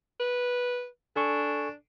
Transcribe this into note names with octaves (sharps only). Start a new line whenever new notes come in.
B4
D4 A4 G#5 C#6